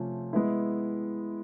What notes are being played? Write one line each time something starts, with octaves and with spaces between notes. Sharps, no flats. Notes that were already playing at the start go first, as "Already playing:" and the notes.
Already playing: C3 F3 A3 C#4 F4
G#3 B3 E4